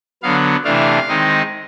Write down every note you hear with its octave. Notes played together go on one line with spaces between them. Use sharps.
D3 F#3 B3 F5
C3 E3 A3 D4 F5
D#3 G#3 C4 D#4